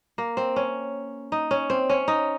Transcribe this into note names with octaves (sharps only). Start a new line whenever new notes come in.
A#3
C4
C#4
D#4
C#4
C4
C#4
D#4